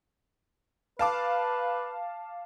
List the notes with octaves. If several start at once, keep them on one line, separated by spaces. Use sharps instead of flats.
B4 F5 A5 D6